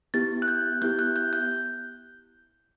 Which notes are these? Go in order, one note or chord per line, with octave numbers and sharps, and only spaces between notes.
B3 E4 G4 A6
F#6
G6
B3 E4 G4 G6
F#6
G6
G6